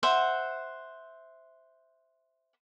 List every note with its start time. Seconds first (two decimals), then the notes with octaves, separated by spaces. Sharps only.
0.03 C5 E5 F#5